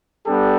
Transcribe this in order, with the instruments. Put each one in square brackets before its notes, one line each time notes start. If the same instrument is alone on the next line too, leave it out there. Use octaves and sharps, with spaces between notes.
[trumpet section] G3 B3 D4 G4 A4